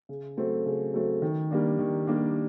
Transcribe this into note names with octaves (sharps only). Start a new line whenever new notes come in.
C#3
F#3 A3 C4
C#3
F#3 A3 C4
D#3
G3 A#3 D4
D#3
G3 A#3 D4